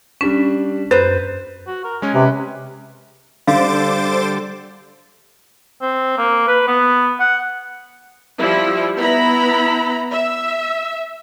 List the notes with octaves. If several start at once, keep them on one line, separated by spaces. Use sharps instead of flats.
G3 C#4 D4 B6
F#2 B4 C5
F#4
A#4
G#3 C#4 G#5
C3 B4
D3 G3 A4 C5 F5 D6 A6
C4
A#3
B4
B3
F#5
F3 G3 E4
B3 E4 A#5 B5
E5